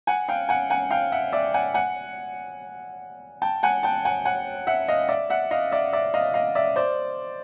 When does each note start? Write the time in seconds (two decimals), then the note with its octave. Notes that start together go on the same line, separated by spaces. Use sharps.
0.07 F#5 G#5
0.29 F5 G5
0.49 F#5 G#5
0.70 F#5 G#5
0.91 F5 G5
1.12 E5 F#5
1.32 D5 E5
1.54 F#5 G#5
1.74 F#5 G#5
3.42 G5 A5
3.63 F#5 G#5
3.83 G5 A5
4.05 F#5 G#5
4.25 F#5 G#5
4.67 E5 F#5
4.88 D#5 F5
5.09 D5 E5
5.30 E5 F#5
5.51 D#5 F5
5.72 D5 E5
5.93 D5 E5
6.14 D#5 F5
6.34 D#5 F5
6.55 D5 E5
6.76 C5 D5